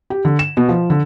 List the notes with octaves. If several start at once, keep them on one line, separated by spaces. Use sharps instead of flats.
G4
D3
E7
B2
F3
D3